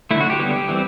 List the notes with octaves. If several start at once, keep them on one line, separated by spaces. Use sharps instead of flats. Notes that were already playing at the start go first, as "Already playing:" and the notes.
D3 F#3 A3 E4
F#4
G4
D3 G3 B3
E3 G3 C4